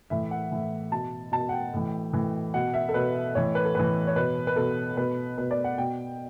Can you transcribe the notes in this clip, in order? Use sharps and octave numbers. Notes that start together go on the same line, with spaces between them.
A2 E3 E5
F#5
A2 E3
B2 A5
B2 A5
F#5
G5
A2 E3
A2 E3
B2 F#5
E5
A4
B2 B4
A2 E3 C#5
B4
A4
A2 E3 B4
C#5
B2 B4
B4
B2 A4
B2 B4
B2 B4
D5
F#5
B2 G5